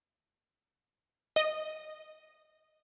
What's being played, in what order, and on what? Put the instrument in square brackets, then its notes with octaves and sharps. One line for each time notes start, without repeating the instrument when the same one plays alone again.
[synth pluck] D#5